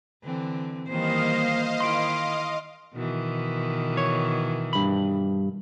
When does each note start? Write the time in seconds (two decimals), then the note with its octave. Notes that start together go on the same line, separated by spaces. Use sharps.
0.23 D3 E3 C4
0.90 D#3 E3 G3 A#3 C5 D#5 F5
1.80 D#3 E4 C6 D7
2.93 B2 D#3 E3
3.97 C#5
4.73 G2 B5